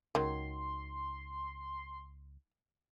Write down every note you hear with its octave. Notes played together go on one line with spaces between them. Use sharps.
C#2 D#3 F#3 C6